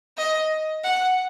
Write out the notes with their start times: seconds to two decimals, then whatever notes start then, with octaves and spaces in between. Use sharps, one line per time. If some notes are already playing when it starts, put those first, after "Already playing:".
0.17 D#5
0.84 F#5